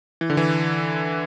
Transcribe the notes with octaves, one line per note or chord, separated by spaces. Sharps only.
E3
D3
E3